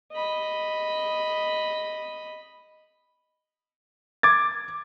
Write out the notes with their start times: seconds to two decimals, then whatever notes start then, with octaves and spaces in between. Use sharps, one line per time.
0.13 D#5 B5
4.23 D6 G#6 A6